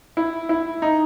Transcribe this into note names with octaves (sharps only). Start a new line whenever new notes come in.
E4
E4
D#4